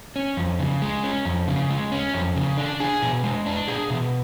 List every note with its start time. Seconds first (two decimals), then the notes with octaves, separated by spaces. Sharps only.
0.16 C#4
0.37 F2
0.59 C#3
0.82 G#3
1.03 C#4
1.25 F2
1.48 C#3
1.70 G#3
1.92 C#4
2.14 F2
2.36 C#3
2.57 D4
2.80 G#4
3.02 B2
3.24 G#3
3.46 D4
3.68 G#4
3.90 B2